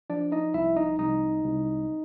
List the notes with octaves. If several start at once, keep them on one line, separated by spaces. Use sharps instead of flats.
F3 D4 D5
D#4 D#5
C2 E4 E5
D#4 D#5
C2 D#4 D#5
C2